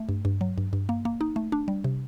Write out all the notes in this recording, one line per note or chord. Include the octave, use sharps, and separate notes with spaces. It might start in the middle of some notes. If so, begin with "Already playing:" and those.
Already playing: A3
G2
G2
F#3
G2
G2
A#3
A#3
D#4
A3
D4
G3
C3